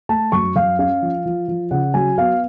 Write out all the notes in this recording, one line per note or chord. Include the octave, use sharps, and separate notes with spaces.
A3 A5
F#2 C#6
F#2 F5
C#4 F5
F3
F3
F3
C#3 F#5
F#3 G#5
B3 F5